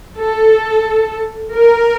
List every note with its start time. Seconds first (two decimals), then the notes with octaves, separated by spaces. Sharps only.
0.19 A4
1.54 A#4